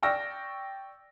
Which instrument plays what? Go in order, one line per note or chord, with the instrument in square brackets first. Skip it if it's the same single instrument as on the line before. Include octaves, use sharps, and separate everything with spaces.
[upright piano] D5 G5 C#6 E6 F6 A#6